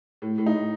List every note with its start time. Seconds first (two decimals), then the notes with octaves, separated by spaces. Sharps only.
0.22 A2
0.38 A2
0.46 D#4
0.54 A2